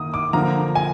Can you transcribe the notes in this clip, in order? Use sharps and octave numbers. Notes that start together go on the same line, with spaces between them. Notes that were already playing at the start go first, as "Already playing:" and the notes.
Already playing: D#3 A#3 D#6
D6
D3 F3 A#3 A#5
G#5